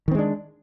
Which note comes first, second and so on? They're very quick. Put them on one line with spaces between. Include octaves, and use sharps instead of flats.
D#3 C4 G#3 D4